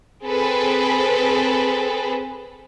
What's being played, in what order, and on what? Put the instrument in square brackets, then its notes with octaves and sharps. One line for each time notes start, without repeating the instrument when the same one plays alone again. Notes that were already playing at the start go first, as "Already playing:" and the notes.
[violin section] C4 G#4 A4 B4